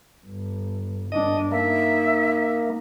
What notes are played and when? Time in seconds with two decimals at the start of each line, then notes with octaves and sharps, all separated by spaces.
0.24 G1
1.12 G1 D4 D#5
1.52 A#3 D#4 E5